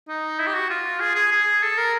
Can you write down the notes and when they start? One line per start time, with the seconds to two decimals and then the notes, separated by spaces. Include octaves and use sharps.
0.08 D#4
0.39 E4
0.47 G4
0.54 F#4
0.70 F4
1.00 G#4
1.15 G#4
1.32 G#4
1.62 A4
1.77 A#4